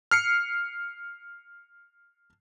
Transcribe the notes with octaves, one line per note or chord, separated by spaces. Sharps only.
F6 C7 C#7